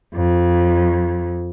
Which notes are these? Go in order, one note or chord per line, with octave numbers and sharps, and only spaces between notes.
F2